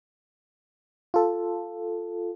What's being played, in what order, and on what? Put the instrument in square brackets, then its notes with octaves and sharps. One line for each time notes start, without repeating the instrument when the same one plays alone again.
[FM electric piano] F4 A4